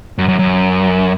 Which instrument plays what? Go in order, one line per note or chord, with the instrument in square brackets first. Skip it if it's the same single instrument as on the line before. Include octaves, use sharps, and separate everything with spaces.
[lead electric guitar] F#2
F#2
F#2